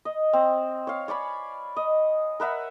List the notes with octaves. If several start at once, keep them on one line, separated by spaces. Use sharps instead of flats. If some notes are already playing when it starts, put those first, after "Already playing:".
D#5
C4
C#5 F5
C#5 D5 G#5 B5
D#5
A#4 B4 E5 F#5